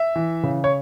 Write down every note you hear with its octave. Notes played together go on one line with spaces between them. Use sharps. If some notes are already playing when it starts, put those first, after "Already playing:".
Already playing: E5
E3
C#3
C#5